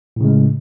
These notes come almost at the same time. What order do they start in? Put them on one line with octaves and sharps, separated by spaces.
A2 C#3 G#3